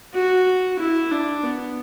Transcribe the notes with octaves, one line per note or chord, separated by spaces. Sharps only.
F#4
E4
D4
B3